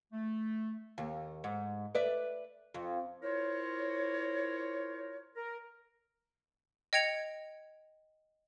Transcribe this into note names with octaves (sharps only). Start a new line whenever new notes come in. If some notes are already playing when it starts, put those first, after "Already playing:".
A3
D#2
G#2
B4 D5 E5
F2
E4 F4 A#4 C5 C#5
A#4
D#5 G5 G#6 C#7 F7